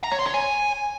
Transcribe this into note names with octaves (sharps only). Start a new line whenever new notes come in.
A#5
C#5
C6
C#5
G#5